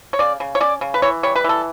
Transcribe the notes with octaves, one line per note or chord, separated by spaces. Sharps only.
C#5
C#3 D5
C#3
C#5
C#4 D5
C#3
B4
E3 C#5
G3 C#5
B4
E3 A4